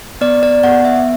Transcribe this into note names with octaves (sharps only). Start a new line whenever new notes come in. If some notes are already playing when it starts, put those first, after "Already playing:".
B3 D5
D5
B3 F#5
E5